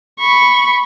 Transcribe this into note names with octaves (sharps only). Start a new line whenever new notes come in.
B5 C#6